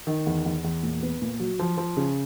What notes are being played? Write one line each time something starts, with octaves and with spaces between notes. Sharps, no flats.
D#3
E2
E2
E2
A#2
B3
A#2
F#3
F3
F3
C#3